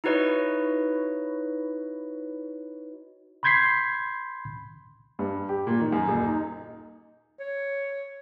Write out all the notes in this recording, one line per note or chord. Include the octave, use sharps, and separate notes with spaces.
D#4 E4 F#4 B4 C#5 D#5
B5 C6 G6 G#6 B6 C7
G2
G4
A#2
D#3
F#2
D#1
D#4
C#5